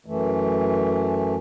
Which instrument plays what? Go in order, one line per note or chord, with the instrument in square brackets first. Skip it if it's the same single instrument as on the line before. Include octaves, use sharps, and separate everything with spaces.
[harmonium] F#2 E3 A3